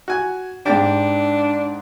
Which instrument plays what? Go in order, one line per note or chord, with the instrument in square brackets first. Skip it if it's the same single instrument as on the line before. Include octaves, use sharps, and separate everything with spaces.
[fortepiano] F#4 G#5
[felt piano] G#2 A6 [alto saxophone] D4 [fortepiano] G4